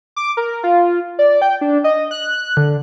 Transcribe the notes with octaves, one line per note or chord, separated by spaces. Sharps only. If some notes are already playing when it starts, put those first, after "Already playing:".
D6
A#4
F4
D5
G5
D4
D#5
F#6
D3